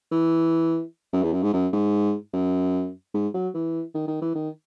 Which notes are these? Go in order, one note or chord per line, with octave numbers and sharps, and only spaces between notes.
E3
F#2
E2
F#2
G#2
F#2
G#2
F#2
G#2
F#3
E3
D#3
D#3
E3
D#3